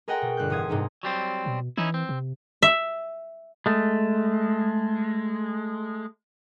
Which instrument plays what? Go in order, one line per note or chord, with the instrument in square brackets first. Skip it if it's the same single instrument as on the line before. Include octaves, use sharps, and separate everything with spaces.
[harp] G#4 A#4 D#5 F#5 G5 A#5
B2
G1 F#6 G6
A1 F5 D#6 G#6
G#2 C3 D#4 G#4
[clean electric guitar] F#3 G3 C4
[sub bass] B2
[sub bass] E3 [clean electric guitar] C#4 D#4 E4
[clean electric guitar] C4
[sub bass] C3
[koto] E5
[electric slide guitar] G#3 A3